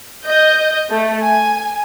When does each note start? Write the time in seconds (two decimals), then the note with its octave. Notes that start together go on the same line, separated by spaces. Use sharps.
0.25 D#5 G6
0.90 A3
1.22 G#5